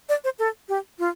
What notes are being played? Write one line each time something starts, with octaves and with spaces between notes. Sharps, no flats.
D5
C5
A4
G4
F4